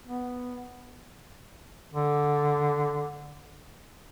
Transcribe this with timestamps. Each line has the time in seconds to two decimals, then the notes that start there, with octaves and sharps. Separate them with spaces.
0.06 B3
1.94 D3